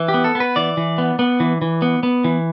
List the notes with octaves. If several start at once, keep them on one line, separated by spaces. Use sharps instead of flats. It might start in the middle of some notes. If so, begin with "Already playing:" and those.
Already playing: E3
G4
B3
A4
B3
B4
E3 D5
E3
B3
B3
E3
E3
B3
B3
E3